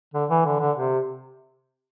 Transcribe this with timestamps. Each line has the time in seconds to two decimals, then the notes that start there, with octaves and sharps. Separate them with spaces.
0.14 D3
0.30 E3
0.45 D3
0.60 D3
0.76 C3